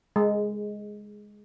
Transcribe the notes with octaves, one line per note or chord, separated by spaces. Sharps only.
G#3